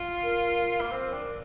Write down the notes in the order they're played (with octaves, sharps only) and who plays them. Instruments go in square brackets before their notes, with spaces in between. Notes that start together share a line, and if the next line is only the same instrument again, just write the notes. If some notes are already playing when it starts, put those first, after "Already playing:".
Already playing: [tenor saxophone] F4
[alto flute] A#4
[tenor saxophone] A#3
C4
D4